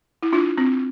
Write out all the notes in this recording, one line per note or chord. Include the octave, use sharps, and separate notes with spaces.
E4
D4 F4
C4